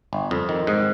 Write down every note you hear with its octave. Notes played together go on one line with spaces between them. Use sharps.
G1
F2
D#3
G#2